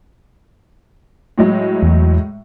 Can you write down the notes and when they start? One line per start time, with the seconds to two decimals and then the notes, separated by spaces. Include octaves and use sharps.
1.38 A2 F#3 G#3
1.83 E2